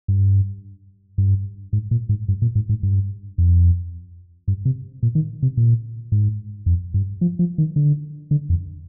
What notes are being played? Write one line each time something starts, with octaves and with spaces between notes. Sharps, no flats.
G2
G2
G#2
A#2
G#2
G2
A#2
G#2
G#2
G2
F2
G2
C3
A#2
D#3
C3
A#2
G#2
F2
G2
F3
F3
D#3
D3
D3
F2